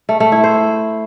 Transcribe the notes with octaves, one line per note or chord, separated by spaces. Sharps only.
A3
A3
E4
C5